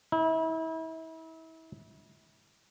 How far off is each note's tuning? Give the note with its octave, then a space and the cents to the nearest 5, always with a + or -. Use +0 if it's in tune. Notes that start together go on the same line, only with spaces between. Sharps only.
E4 -35